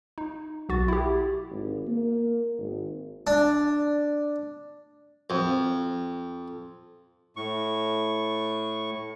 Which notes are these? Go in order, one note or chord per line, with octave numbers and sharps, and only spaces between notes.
D#4
B1 F#4 A6
E4 G4
G#1
A#3
G#1
D4
F2
A2 C#6